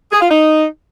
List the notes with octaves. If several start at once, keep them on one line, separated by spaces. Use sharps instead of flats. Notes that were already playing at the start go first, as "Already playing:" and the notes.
G#4
F4
D#4